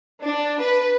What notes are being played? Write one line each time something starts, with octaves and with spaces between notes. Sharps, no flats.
D4
B4